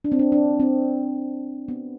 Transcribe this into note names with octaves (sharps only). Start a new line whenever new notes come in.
D4
C4
D4
D4
C4
B3